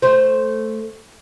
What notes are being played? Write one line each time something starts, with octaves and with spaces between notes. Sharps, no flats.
A3 C5